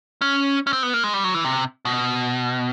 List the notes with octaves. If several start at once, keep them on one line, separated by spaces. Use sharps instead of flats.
C#4
C#4
C4
B3
A#3
G#3
G3
F#3
E3
C3
B2